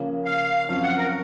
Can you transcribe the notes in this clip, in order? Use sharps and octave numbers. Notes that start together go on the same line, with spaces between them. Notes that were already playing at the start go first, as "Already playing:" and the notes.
Already playing: C#3 F3 A#3
F5
F#2 F3 C4 F5
F#5
A#4